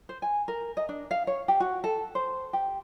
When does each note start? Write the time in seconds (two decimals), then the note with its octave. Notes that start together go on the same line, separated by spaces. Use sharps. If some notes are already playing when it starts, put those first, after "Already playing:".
0.09 C5
0.22 G#5
0.48 A#4
0.77 D#5
0.89 D4
1.11 F5
1.27 C#5
1.48 G4
1.60 F#4
1.84 A4
2.15 C5
2.53 G4